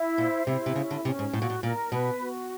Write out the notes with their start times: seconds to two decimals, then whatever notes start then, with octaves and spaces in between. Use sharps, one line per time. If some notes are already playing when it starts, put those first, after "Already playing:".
Already playing: E4
0.18 A#2 C5
0.46 C3 E4
0.66 C3
0.76 C#3 C#4
0.91 D3
1.05 C3 C#4
1.19 G#2
1.33 A2 F#4
1.42 A#2
1.50 A2
1.63 A#2 A#4
1.92 B2 B4
2.21 F#4